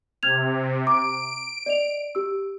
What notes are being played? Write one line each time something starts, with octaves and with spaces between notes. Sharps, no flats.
C3 F6 G#6 F7
A#5 D6 D7
D5 D#5 F7
G4 E6